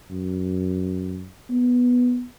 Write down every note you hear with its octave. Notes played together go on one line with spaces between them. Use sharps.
F#2
B3